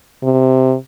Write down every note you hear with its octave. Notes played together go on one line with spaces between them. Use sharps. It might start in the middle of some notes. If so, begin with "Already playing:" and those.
C3